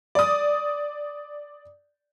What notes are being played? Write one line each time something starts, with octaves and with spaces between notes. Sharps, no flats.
D5 D#6